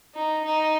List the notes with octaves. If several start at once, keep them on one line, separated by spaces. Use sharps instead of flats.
D#4
D#4